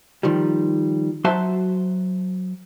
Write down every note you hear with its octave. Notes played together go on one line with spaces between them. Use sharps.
D#3 F3 G3
F#3 F#4 C5 E5 A5 C6